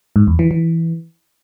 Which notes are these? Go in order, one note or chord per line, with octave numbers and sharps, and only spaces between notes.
G#2
E2
E3
E3